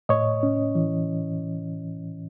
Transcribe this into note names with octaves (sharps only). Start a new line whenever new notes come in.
A2 C#5 D#5
C#4
E3